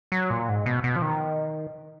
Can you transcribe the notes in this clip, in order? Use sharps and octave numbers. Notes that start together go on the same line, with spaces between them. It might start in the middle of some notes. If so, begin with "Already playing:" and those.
F#3
A#2
G#2
B2
B2
F3
D#3